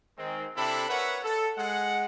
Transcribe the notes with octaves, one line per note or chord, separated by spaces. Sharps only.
D#3 G#3 C4
C3 C4 D4 E4 A4 B5
A#4 B4 C#5 E5 F#5
A4
G#3 F#5